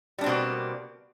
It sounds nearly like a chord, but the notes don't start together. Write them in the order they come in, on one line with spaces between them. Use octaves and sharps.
G3 D4 C4 B2 A#3